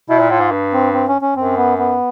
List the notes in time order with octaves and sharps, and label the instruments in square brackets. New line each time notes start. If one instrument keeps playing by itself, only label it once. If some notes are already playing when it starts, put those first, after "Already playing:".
[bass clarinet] B2 [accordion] E4
[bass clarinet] A#2
[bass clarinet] A2 [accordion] F4
[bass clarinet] G#2
G2
[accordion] C4
C4
C#4
C#4
[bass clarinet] F#2 [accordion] C4
[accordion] B3
B3